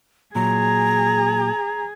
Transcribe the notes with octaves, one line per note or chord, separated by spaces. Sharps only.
A#2 F#3 G#4 A#5